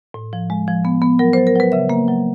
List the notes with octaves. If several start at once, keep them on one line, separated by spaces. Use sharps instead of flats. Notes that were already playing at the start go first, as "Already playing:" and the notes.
A2
F3
G#3
F3
B3
B3
F#3 A#4
F#3 C5
A#4
F#3 B4
C#3 E5
A#3
F#3